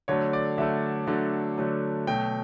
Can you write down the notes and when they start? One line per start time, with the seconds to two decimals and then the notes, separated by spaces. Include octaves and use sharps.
0.08 D3 F#3 A3 C#5
0.33 D5
0.58 D3 F#3 A3 E5
1.07 D3 F#3 A3
1.58 D3 F#3 A3
2.07 B2 F#3 A3 G5